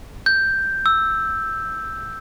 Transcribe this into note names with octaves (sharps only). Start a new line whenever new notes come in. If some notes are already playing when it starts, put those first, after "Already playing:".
G6
E6